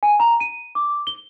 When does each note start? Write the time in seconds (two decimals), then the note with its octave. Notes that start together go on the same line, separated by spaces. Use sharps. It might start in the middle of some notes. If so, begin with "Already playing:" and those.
0.03 G#5
0.20 A#5
0.40 D#7
0.75 D6
1.07 G7